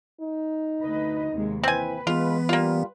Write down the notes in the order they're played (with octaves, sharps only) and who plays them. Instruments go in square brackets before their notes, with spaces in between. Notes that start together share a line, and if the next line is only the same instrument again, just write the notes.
[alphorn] D#4
[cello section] D2 B4 D#5
D#2 C3 G#3
[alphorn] E3 [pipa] C4 G#5 [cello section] B4
[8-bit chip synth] E3 B3 [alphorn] G#3 [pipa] F4
[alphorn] G3 [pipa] A#3 F4